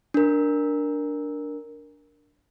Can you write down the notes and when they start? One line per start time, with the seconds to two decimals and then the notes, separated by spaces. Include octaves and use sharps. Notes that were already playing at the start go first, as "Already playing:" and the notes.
0.14 D4 A#4